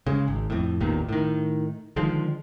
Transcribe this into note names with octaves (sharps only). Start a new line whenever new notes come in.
C#3 G#3
G#1
F2 A2
A1 E2 A#2 D#3
A2 D#3
D3 D#3 F3 G#3